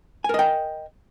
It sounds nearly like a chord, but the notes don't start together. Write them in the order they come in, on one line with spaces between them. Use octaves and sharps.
G#5 A#4 D#5 G5